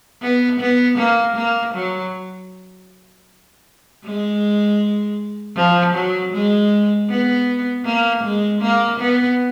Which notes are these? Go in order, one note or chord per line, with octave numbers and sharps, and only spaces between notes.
B3
B3
A#3
A#3
F#3
G#3
F3
F#3
G#3
B3
A#3
G#3
A#3
B3